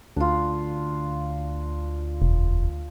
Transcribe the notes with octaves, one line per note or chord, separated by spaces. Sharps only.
D2 D4 F4
E1